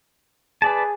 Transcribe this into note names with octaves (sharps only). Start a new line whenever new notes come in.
G#4 B4 D5 A5